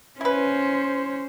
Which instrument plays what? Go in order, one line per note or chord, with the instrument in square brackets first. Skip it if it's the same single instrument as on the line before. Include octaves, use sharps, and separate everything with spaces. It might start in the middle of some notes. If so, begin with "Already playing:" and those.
[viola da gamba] C#4 [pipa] E4 B4 [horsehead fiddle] C5